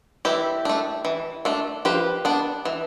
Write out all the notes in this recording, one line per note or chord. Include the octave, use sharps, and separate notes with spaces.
E3 E4 G4
A3 D4
E3
A3 D4
F3 G4 B4
B3 D4
E3